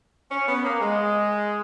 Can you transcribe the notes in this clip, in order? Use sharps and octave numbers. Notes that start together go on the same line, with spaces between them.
C#4
B3
A#3
G#3